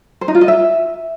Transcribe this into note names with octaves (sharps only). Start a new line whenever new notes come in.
C5
D#4
F4
D#5
E5